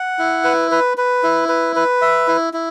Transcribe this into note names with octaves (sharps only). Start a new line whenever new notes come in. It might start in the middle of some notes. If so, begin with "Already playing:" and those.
Already playing: F#5
E4
B4
B4
B4
E4
B4
B4
E5
E4
E4